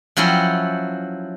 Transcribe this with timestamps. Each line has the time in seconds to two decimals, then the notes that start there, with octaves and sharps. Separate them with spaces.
0.17 F3 F#3 C#4 E4 F#5 G5